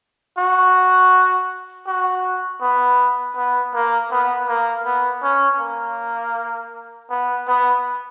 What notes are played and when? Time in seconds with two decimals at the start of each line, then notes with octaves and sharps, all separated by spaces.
0.38 F#4
1.87 F#4
2.61 B3
3.36 B3
3.74 A#3
4.12 B3
4.48 A#3
4.85 B3
5.23 C#4
5.60 A#3
7.10 B3
7.47 B3